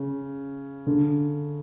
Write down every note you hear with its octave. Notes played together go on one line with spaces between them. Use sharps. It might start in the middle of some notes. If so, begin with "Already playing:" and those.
Already playing: C#3
D3